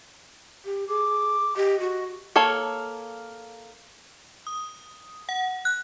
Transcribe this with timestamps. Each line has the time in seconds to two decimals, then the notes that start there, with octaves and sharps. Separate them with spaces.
0.65 G4
0.89 G#4 D6
1.56 G4 D#5
1.80 F#4
2.36 A#3 A4 C#5 F5
4.47 D#6
5.29 F#5
5.65 F#6